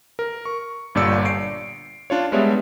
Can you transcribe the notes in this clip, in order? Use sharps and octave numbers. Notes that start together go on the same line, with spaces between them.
A#4
C#6
G1 G2 A#2 D5 E6 C#7
C7 D7
D4 F4 C#5
G3 G#3 B3 D4 C#5 E5